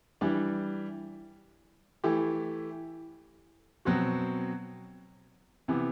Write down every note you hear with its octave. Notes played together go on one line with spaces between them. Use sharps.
E3 G3 D4
E3 A3 E4 G4
B2 F#3 C4 F#4
C3 E3 B3